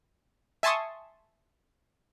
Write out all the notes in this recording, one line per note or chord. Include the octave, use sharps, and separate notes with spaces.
E5 G#5 A5 C6 C#6 D#6